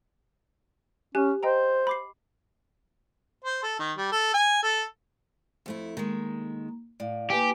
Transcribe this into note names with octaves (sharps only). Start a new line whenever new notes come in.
C#4 G4 G#5 F#6
C5 D#5 G5 A#5
B5 D6 C7
C5
A4
D#3
G3
A4
G#5
A4
F2 A3 E4
D#3 G#3 A#3
A2 D5 F5
A#3 G4 B4 G#5